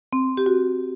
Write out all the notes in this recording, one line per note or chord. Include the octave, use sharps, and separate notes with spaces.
C4
G4
F#4